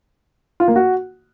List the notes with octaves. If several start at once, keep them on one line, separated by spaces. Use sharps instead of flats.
F4
A#3
F#4